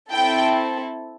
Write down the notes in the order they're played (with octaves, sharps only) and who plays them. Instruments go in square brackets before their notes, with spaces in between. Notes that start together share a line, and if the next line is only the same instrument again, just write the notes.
[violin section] C4 E4 A4 G5